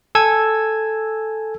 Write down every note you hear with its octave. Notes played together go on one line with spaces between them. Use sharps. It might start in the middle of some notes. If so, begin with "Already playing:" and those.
A4 G#5 E6 G#6